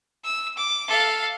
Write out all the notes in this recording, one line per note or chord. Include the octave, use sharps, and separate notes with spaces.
E6
D6
A4 F5